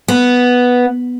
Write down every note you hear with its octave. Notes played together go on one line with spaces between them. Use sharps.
B3